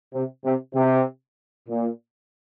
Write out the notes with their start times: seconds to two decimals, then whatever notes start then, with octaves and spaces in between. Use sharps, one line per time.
0.13 C3
0.44 C3
0.74 C3
1.68 A#2